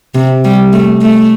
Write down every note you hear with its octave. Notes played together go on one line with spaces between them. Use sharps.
C3
G3
A3
A3